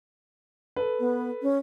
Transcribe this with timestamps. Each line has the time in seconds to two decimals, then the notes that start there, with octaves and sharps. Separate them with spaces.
0.76 A4 B4
1.00 B3
1.42 C#4